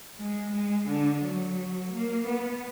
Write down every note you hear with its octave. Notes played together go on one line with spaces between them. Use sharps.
G#3
G#3
D3
F#3
A#3
B3